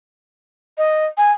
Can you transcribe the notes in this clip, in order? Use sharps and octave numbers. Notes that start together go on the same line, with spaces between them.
D#5
G#5